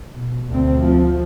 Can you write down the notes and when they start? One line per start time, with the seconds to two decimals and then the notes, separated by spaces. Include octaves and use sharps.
0.15 B2
0.49 D2 C4
0.81 F3